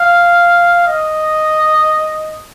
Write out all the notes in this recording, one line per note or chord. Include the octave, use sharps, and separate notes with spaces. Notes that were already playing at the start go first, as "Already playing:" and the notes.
Already playing: F5
D#5